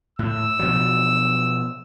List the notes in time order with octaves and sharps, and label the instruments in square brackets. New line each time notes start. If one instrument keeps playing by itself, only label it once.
[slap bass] A2 [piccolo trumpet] E6
[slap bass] B2 F3 F#3